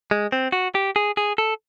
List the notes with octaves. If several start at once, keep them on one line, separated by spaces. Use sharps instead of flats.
G#3
C4
F#4
G4
G#4
G#4
A4